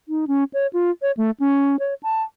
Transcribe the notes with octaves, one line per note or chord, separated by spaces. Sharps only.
D#4
C#4
C#5
F4
C#5
A3
C#4
C#5
A5